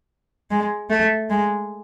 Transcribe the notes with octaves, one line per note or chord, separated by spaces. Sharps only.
G#3
A3
G#3